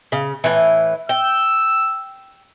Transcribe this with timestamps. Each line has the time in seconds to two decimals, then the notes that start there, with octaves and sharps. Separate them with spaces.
0.12 C#3
0.44 A2 E3
1.09 G5 E6